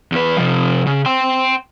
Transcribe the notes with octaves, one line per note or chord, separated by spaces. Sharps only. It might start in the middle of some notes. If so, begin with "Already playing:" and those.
E2 B4
C3 F3
C#3
G5 C6